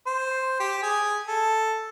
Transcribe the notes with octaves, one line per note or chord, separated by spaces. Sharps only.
C5
G4
G#4
A4